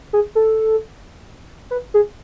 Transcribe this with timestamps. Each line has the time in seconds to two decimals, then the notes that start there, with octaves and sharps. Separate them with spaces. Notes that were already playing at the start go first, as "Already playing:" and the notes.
0.13 G#4
0.35 A4
1.71 B4
1.94 G#4